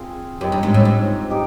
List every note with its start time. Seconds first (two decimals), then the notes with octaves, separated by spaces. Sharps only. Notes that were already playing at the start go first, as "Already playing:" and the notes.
Already playing: C4 F4 G#4 C5
0.41 F#2 C4 D#4 G4
0.52 G2
0.63 G#2
0.74 A2
0.85 G#2
1.30 D#4 G4